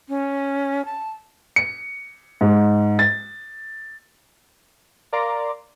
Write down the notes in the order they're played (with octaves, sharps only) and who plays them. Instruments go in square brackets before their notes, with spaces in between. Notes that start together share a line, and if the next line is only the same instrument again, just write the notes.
[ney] C#4
A5
[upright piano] C#7
G#2
A6
[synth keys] A#4 D5 F5 A#5 C6 D6